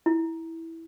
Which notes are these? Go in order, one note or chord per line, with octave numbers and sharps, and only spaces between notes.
E4